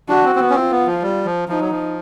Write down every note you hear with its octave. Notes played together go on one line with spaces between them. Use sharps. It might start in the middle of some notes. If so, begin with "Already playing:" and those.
D4 F#4
C4
C4
B3
C#4
C4 F4
B3
F3
G3
F3
F3 D#4
F#3
F3